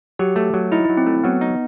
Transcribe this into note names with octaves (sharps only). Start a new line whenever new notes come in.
F#3 G4
A3
F#3
D#4 E4
F#3 E4
C4
A3
F#3 B3
D#4